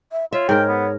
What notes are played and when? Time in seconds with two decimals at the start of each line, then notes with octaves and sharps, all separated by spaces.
0.12 E5
0.33 F4 C#5 E5
0.49 G#2 A#4 G5
0.68 B3